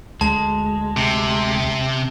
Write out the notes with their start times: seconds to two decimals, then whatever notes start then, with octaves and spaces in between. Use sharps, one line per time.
0.21 D2 G#3 A5
0.97 C3